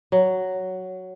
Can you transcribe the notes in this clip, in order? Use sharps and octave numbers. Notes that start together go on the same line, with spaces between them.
F#3